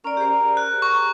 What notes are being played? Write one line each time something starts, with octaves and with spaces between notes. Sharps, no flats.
C#4 A#4 D5
G4 G#4 C5
F#6
C#6